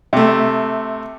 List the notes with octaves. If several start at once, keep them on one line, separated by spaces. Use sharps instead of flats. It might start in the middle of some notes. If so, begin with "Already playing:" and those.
C3 A3